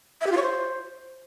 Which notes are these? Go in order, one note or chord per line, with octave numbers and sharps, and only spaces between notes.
E5
G4
F4
C#5
C5